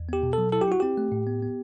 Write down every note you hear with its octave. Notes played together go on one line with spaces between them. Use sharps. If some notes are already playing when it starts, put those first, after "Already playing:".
Already playing: E2
B3 G4
B2
A4
F#3
E4 A4
G4
E4 F#4
C4 G4
A3
A2
B3
B3